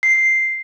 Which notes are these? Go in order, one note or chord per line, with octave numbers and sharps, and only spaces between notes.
C7